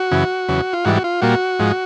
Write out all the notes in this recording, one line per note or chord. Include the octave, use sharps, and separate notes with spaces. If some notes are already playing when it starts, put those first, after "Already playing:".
Already playing: F#4
F#2 C#3 E3
E2 C#3 F#3
F4
G#2 E3 G3 F#4
F#4
F4
A#2 G3 A#3 F#4
G#2 F3 G#3